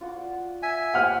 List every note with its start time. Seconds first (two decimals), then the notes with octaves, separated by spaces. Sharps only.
0.01 F4 F#4 D6
0.16 D5
0.63 E5 G#5
0.94 G4 C5 C#5 F#5 F6